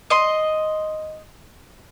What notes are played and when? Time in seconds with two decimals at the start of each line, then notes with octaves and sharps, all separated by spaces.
0.10 D#5 C6